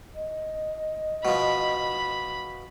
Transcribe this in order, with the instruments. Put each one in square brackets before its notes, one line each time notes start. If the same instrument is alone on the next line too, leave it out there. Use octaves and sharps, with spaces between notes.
[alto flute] D#5
[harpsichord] B2 F3 [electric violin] B5